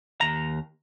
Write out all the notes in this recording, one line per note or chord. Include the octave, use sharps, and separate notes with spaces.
D#2 A#5